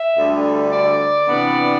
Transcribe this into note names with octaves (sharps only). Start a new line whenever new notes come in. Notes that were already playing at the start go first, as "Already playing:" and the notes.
Already playing: E5
D2 D3 G3
D5
C3 E3 B3 D4